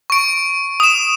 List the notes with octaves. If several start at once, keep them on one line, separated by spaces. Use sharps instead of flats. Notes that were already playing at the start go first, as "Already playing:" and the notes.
C#6 D7
D#6 E7